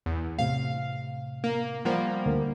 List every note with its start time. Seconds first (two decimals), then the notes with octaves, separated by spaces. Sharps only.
0.06 E2
0.38 A2 C3 F5
1.44 A#3
1.85 F3 G3 A#3 C5 F#5
2.26 D2 D3 A#4